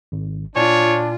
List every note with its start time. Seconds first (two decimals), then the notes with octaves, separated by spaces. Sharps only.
0.12 G#1
0.56 A#2 D4 F4 C#5 D5 G#5